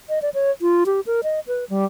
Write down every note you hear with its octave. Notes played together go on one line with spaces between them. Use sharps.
D#5
D5
C#5
F4
G4
A#4
D#5
B4
G3